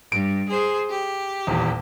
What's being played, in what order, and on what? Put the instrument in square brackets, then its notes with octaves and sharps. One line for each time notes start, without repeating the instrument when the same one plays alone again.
[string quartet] G2 [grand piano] D7
[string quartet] G#4 C5
G4
[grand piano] D#1 E2